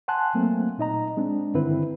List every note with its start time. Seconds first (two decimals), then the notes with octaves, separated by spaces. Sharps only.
0.08 F#5 G#5 A5 C6 F#6
0.35 F#3 A3 A#3 C4
0.78 A#2 D#4 D#5 A#5
1.17 G#3 C4 D4
1.54 G2 D3 D#3 C4 E4 B4